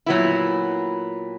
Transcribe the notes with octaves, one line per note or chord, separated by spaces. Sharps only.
A#2 F#3 B3 E4